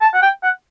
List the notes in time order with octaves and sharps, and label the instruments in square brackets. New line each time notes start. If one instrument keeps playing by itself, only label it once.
[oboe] A5
F#5
G5
F#5